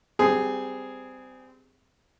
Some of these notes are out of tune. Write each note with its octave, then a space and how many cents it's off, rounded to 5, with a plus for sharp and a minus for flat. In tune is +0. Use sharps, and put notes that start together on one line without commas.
G3 +0 C4 -25 G#4 +0